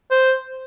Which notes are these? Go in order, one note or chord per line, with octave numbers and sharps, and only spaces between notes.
C5